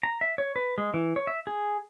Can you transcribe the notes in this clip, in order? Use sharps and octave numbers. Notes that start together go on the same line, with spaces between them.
A#5
E5
C#5
B4
G#3
E3
C#5
E5
G#4